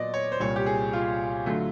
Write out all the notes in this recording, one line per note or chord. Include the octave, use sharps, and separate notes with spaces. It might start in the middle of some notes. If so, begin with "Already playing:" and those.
Already playing: A#2 F#3 B3 D5 D#5
C#5
C5
C2 A#2 G3 C#5
G4
G#4
F4
D3 F#3 A3